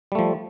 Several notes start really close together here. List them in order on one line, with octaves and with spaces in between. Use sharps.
G3 A3 F3